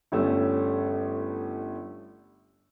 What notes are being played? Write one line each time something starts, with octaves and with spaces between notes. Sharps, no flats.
G1 G3 A3 C#4 E6